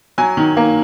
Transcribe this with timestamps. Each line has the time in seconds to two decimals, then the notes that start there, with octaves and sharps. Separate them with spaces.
0.18 F#3 G#5
0.37 D#3
0.57 A#3